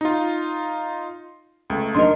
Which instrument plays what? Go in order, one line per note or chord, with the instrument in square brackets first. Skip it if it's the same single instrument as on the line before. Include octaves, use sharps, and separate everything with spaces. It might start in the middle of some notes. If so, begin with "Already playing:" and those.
[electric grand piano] D#4 F4
C#2 A3
[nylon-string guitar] D4 D#4 A#4 [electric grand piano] C6